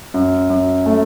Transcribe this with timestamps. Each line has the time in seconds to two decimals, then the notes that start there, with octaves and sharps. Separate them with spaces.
0.14 F#2
0.50 F#2
0.86 A3